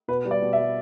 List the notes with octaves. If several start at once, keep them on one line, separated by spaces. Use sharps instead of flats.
B2 B4
G3
D5
B2
E5
G3